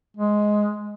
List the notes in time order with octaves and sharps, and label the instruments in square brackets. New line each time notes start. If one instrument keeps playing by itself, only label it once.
[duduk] G#3